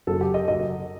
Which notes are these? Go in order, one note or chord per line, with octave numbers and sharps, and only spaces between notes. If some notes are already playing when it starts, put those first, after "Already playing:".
F#1 F#2 F#3 A4
G4
D#5
F#1 F#2 F#3 D#5